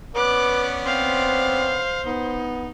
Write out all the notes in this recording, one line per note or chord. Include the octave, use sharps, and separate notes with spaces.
B3 C#4 B4 D5 D6 F#6
C4 C5 F5
B3 D#4